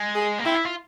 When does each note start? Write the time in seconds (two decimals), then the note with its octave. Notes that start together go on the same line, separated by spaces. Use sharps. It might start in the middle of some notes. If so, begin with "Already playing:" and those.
Already playing: G#3
0.15 G#4
0.39 A#3
0.44 C4 E4
0.55 E4
0.65 F4